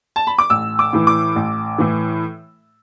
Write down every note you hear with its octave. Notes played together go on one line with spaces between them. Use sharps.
A5
B5
D6
A1 E6
D6
A2 E3
D6
A1
A2 E3